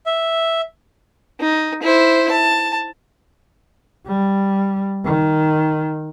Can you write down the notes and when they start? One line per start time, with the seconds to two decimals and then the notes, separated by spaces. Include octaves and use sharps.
0.06 E5
1.40 D#4
1.82 E4 C5
2.31 A5
4.07 G3
5.05 D#3